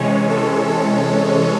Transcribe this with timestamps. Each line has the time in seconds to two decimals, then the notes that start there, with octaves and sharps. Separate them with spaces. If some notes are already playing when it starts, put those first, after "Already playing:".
Already playing: C3 E3 G#3 C#4 C#5
0.30 A4
0.68 A4